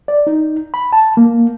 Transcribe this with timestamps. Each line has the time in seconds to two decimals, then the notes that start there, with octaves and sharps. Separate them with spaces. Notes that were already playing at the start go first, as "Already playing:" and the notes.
0.08 D5
0.27 D#4
0.74 B5
0.93 A5
1.17 A#3